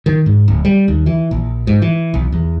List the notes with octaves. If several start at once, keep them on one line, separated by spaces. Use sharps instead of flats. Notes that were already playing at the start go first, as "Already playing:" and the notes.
D#3
G#2
D1
G3
D#2
E3
A#1
G#2
E3
B1
E2